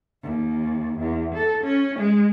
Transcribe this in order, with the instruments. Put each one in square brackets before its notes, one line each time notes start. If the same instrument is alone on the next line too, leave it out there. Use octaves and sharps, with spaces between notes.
[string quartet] D#2
E2
A4
C#4
G#3